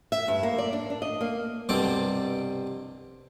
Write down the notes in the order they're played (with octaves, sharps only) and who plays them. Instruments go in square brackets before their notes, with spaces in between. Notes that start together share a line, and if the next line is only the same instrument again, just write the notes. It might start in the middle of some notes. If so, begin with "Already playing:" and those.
[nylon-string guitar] E5
G2
A#3
D5
D4
D4
D#5
A#3
[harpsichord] C2 G2 B2 C4 A4 D6